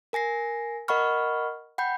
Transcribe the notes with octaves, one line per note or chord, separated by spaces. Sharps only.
A#4 G#5 A#6 C7
A#4 D#5 F#5 B5 C#6 F6
F#5 G5 B5 G6